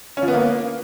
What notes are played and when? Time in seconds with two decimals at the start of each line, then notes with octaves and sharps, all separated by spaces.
0.17 C#4
0.22 F3
0.28 B3
0.33 A#3